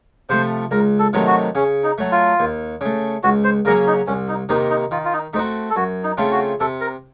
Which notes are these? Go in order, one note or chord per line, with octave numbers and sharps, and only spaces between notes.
C3 F3 A3 C5
C#2 A#4
A4
C3 D#3 F#3 A3
F#4
C#3 C#4
D#4
F#3 A3
F4
D#2
C#3 A3
C#2 F#4
C5
C#3 F#3 A#3 C#4 A#4
D#4
C2 C#4
D#4
C3 D#3 A#3 D#4
D#4
D#3 F4
F4
D#4
A3 C4 D#4 F#4
A4
F#2 F#4
D#4
C#3 A3 C4 F4
F#4
C3 A4
A#4